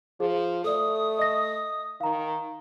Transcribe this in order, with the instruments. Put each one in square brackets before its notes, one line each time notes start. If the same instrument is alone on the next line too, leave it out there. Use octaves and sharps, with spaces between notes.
[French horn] F3 [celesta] G#4
[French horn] A3 [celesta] A4 D5 [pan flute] D#6
[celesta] D#5 A#6
[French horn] D#3 [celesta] F5 A#5